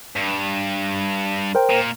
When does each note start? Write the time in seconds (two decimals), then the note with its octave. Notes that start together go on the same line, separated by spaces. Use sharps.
0.16 G2
1.55 A#4 C5 G5
1.70 A#2